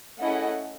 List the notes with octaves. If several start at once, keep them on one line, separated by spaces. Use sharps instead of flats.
A3 C#4 E4 G#4 D#5 F#5